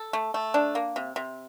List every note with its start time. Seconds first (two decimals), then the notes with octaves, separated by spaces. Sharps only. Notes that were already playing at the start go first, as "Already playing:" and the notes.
Already playing: A4
0.13 A3
0.34 A3
0.54 D4
0.75 A#3
0.96 C3
1.16 C3